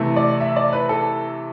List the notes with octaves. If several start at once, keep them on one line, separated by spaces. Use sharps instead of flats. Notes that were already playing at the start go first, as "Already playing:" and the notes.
Already playing: C3 E3 A3
D5
E5
D5
B4
A4